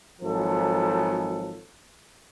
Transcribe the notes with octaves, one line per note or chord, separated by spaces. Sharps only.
G#1 F3 F#3 A4